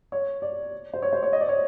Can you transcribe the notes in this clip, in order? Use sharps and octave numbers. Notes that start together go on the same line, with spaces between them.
C#5
D5
C5
C#5
C5
C#5
D#5
D5
C#5